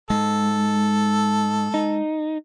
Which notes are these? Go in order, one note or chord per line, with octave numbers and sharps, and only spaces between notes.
G#2 G#3 A4
D#4